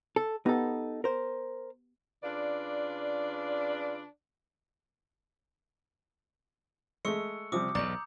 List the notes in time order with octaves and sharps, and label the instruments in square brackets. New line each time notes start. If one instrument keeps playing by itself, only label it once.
[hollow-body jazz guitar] A4
[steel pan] B3 G4 [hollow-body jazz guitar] D#4 A4
[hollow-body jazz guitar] A#4 C5
[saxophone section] C#3 D4 F4 B4 D5
[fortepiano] G#3 A3 [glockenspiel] C#6 E6 C#7
[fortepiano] C3 F3 G3 [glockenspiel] D6 D#6
[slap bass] B1 E2 [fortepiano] D5 C#6 [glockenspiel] A#5 G6